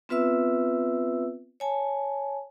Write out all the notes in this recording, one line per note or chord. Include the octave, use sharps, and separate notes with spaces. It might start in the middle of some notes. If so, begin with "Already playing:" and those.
B3 C4 F4 B4 E5 E6
C#5 G#5 A5